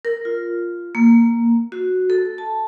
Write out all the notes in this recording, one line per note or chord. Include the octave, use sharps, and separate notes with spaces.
A#4
F4
A#3
F#4
A4
A5